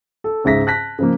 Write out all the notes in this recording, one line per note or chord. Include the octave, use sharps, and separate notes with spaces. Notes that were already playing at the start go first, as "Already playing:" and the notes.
A4
C#2 G#2 E5 A#6 B6
A5 F#6 A#6 B6
C#3 F3 A#3